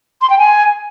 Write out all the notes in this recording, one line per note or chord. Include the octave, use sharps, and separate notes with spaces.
C6
G5
G#5